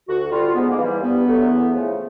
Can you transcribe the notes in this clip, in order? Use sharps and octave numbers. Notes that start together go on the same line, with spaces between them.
D2 F#4
D3 G3 F4
G#2 B3
A#3
E3 G3
G2 B3
D3 F#3 A3
E2
C#3 F3 A3